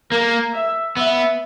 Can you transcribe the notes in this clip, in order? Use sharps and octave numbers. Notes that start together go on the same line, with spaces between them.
A#3 A#4
E5
B3 E5